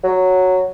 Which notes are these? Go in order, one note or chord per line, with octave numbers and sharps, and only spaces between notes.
F#3